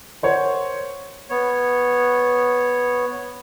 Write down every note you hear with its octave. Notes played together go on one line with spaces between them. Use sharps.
A#4 C5 C#5 F#5
B3 C#5